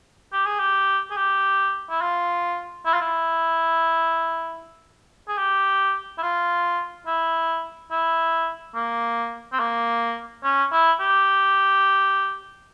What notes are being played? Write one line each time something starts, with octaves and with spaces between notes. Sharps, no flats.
G4
G#4
G4
G#4
G4
E4
F4
E4
F4
E4
G#4
G4
E4
F4
E4
E4
A#3
C4
A#3
C#4
E4
G4